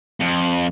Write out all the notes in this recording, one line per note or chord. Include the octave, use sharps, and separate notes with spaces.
F2